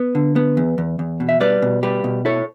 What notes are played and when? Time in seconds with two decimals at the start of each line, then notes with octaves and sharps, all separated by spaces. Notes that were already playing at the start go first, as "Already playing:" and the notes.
Already playing: B3
0.15 D3
0.36 B3
0.57 E2
0.78 E2
0.99 E2
1.20 B2
1.29 E5
1.40 G3 B4 D5
1.62 B2
1.83 G3 G4 B4
2.04 B2
2.25 E4 A4 C#5